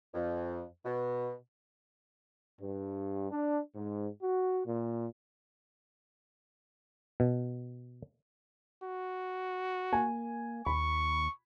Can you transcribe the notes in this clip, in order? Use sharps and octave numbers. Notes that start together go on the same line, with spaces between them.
F2
B2
G2
D4
G#2
F#4
A#2
B2
F#4
A#3 G#5
D#2 B5 C#6